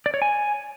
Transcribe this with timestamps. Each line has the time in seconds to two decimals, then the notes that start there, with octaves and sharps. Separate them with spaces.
0.06 D5
0.14 C#5
0.22 G#5